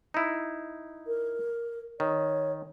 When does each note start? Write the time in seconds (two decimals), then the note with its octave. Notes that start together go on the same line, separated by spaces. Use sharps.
0.14 D#4 E4
1.07 A#4
2.00 D#3 C#5